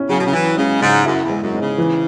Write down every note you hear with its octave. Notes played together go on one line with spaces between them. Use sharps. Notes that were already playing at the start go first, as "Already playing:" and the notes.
Already playing: C#4 E4
C#3 F#3
B2
C#3
E3 E4
C#3 G#3
G#2 C#3
F#2 E4
E2
G#3
F#2
G#2
C#3
E3